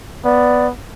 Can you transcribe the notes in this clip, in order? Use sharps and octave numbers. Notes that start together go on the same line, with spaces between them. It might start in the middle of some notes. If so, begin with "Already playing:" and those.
B3 D5